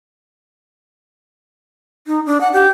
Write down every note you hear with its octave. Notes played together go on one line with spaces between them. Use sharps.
D#4
D4
F#5
G4